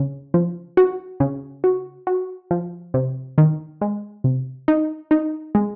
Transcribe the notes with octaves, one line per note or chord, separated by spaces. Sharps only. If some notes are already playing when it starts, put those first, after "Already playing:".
Already playing: C#3
F3
F#4
C#3
F#4
F#4
F3
C3
D#3
G#3
C3
D#4
D#4
G#3